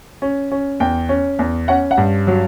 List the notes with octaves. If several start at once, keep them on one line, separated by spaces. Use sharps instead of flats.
C#4
C#4
E2 G5
C#4
E2
C#4 F#5
F#5
G2
F#3